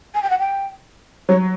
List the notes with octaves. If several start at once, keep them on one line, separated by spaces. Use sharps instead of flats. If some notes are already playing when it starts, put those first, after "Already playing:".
G#5
G5
F#5
G5
F#3 C#5